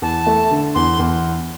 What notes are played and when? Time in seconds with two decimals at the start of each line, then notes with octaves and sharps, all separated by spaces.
0.02 E2 A5
0.27 A3
0.51 D3
0.75 E2 C6
0.99 E2